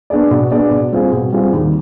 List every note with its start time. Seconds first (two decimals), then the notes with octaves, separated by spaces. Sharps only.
0.10 B3 D4 G#4 D5
0.31 B2
0.51 B3 D4 G#4 D5
0.71 B2
0.92 G3 C4 F4 G#4
1.12 B2
1.32 G3 C4 F4 G#4
1.53 D#2